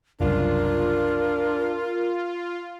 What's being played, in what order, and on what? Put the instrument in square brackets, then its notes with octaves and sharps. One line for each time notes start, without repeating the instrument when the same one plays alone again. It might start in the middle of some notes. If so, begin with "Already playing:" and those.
[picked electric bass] F#1 C2 F#2 [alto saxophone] D4 [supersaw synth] F4 [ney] A#4